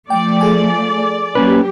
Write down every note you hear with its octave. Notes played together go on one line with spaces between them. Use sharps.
F3 A3 D5 G5
G#4 A4 G#5
F#3 A#3 C#4 G4 B4